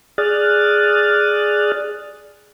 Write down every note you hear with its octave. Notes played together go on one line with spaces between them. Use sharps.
G#4 D5 D#6 F6 F#6 A6